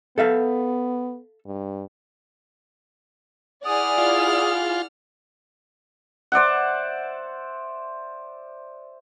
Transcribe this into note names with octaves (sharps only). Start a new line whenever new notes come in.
B3 A4 E5 F5
G2
E4 G#4 D5 F#5 D#6 F6
F4
C5 D5 E5 F#5